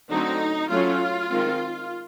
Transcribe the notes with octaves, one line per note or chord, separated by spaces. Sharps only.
D3 F#3 A3 C4 D#4
F#3 A3 C#4 F4
D#3 G#3 C4